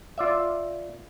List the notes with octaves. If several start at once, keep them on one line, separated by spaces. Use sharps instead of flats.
F4 D5 E5